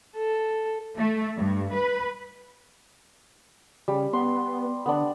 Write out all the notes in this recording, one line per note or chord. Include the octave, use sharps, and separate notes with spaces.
A4
A3
G2
B4
C#3 G3
B3 C6
D3 B3 D4